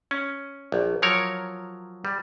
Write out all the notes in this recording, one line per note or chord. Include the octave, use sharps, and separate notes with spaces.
C#4
A#1
F3 F#3 A#4 C#5
G3